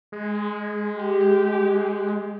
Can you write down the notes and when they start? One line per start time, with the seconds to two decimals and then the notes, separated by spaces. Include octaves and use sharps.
0.12 G#3
0.99 G4